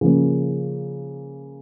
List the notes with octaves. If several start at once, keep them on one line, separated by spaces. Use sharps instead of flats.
C#3 F3 A#3